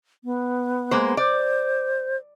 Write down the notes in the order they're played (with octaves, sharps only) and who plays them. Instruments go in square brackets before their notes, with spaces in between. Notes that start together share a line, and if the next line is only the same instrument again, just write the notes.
[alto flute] B3
[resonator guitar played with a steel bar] G#3 A#3 C5
[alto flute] C5 [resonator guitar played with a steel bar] D5